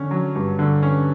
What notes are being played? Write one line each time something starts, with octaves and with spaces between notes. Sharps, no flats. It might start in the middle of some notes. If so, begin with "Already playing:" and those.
Already playing: D3 C#4
F#3
G2
D3
C#4